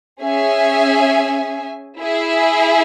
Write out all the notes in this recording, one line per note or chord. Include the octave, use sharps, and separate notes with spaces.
C#4 G#4 E5 G#5
E4 G#4 E5